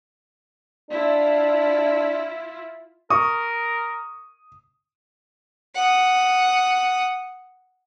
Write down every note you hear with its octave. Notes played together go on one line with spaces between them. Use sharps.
D4 E4 F4
A#4 C#6 D#6
F#5 D#6